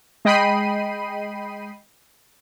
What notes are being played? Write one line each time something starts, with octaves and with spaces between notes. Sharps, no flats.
G#3 D#5 G5 B5 C7 D#7